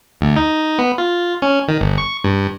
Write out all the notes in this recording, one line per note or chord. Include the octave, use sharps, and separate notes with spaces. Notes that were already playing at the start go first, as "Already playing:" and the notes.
D2
D#4
B3
F4
C#4
D#3
G1
C#6
G2